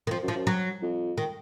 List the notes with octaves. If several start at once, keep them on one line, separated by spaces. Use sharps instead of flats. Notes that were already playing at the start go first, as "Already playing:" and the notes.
D#3
F2 F3
F#2
F3
F#2
F#3
F2
D#3